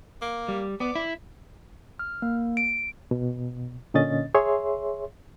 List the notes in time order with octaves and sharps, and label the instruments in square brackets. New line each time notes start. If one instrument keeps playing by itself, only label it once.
[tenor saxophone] A#3
[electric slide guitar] G3
[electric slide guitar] B3 [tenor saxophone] D5
[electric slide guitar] E4
[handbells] F6
A#3
D7
[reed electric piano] B2
A#2 D3 C#4 D#5 A6
G#4 C#5 E5 C6